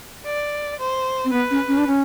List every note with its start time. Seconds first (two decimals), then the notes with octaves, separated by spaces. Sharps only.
0.26 D5
0.80 C5
1.25 C4
1.32 B3 B4
1.51 C#4
1.68 C#4
1.78 D4
1.87 C#4